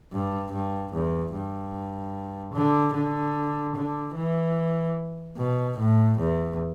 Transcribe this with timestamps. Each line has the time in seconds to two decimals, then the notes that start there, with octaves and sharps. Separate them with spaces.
0.13 G2
0.52 G2
0.93 E2
1.34 G2
2.54 D3
2.94 D3
3.76 D3
4.16 E3
5.37 B2
5.78 A2
6.19 E2